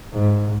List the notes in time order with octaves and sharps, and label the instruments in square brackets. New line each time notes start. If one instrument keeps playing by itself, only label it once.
[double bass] G#2